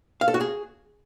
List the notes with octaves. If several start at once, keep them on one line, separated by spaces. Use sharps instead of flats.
F5
A4
F#4
G#4